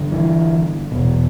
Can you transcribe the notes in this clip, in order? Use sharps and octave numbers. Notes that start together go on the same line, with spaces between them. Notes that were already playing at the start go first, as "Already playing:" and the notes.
Already playing: G2 D3
E3
E2 B2